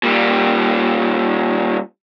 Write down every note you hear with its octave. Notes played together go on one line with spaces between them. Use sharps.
A#2 G3